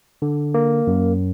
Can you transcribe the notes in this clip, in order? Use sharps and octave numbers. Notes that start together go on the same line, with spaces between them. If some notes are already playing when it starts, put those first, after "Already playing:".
D3
A#3
F#2